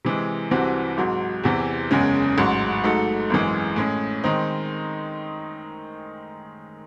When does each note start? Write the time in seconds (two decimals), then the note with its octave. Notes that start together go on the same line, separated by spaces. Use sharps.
0.05 C3 E3 G#3
0.51 C2 C3 E3 C4 F#4
0.97 G#1 G#2 F#3
1.44 E2 C3 E3
1.91 F#1 E2 C#3 G#3 C#4
2.38 A1 G#2 F#3
2.84 G#2 F#3 A3 D#4 A4
3.30 G#1 F#2 E3 G#3
3.76 A2 G#3 C#4
4.24 D#3 G#3 C4 D#4